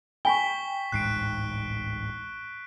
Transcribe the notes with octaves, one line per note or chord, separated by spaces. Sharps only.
G5 G#5 B5 C#6 B6 G7
D1 A1 G#2 F#6 C7 D7